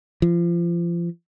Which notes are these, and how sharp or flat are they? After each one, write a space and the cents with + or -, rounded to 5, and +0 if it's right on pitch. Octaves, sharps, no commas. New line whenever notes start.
F3 -30